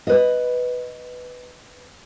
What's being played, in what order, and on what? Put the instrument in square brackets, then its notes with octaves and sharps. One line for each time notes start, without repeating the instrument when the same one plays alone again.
[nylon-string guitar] B4 D#5